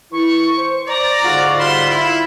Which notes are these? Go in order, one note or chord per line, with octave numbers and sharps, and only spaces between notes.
E3 E4 C#6
C5
D5 A#5
G#2 D3 F4 F#4
G3 F4 F#5 B5 C6 E7
E4